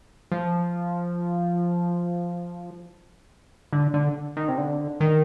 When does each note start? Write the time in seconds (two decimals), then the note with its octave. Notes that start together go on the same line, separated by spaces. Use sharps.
0.32 F3
3.73 D3
3.94 D3
4.37 D#3
4.48 C3
4.58 D3
5.00 D#3